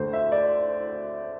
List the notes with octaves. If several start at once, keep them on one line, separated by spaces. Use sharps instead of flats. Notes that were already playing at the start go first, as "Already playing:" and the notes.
Already playing: D2 D3 C5
E5
D5